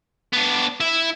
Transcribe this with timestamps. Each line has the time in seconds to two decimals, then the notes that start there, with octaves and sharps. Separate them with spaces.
0.33 B3 D4
0.80 E4 E5